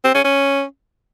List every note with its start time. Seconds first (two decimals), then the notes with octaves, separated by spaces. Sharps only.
0.04 C4
0.15 C#4
0.25 C#4